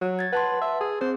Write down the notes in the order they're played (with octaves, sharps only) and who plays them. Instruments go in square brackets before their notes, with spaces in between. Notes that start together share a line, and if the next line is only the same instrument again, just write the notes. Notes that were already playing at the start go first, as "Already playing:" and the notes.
[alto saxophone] F#3
[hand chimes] G#6 A6
[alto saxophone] B4 [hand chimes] F#5 A5 C6
[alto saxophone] E5
G#4
[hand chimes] C4 G#4 [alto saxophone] C5